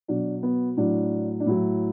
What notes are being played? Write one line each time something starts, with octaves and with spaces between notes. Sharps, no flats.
B2 F#3 D4
B3
A2 F#3 D4
D4
A2 F#3 E4